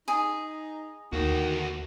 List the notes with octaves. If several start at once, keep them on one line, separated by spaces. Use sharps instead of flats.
D#4 G#4
D#2 D3 D#3 F#4